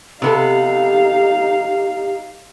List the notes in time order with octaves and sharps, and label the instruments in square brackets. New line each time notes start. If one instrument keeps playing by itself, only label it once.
[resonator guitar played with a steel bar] C3 B3 A4 [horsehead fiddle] D#4 F5 [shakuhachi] G4